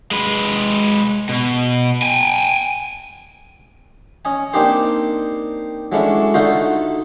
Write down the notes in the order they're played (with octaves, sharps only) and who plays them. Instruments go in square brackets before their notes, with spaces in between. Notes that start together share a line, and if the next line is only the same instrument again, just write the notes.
[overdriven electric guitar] G#3 B4
B2
G5 G#5
[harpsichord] C#4 D#5 G#5
A#3 C4 D4 D#4 G4 C5
F#3 G#3 A3 C#4 D4 E4
D3 A3 D#4 F4 F#4 C5